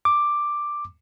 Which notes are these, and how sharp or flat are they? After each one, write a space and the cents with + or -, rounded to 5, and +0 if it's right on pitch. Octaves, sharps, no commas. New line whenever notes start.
D6 +5